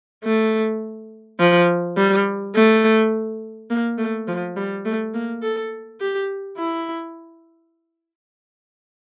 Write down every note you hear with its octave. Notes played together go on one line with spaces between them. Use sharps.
A3
F3
G3
A3
A#3
A3
F3
G3
A3
A#3
A4
G4
E4